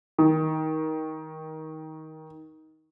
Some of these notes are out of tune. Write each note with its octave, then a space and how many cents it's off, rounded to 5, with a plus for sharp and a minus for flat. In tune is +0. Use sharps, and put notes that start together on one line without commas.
D#3 +20